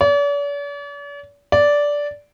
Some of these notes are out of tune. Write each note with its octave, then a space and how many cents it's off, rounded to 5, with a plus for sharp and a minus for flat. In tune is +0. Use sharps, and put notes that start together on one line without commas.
D5 -45
D5 -10